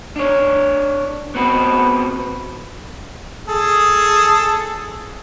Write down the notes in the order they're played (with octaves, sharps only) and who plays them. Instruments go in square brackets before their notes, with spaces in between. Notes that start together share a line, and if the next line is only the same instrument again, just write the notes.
[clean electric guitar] D4 C#5
B3 C4 F#4 B4
[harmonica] G#4 A4